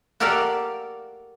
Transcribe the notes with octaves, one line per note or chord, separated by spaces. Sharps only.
F#4 G4 A4 A#4 D5 F5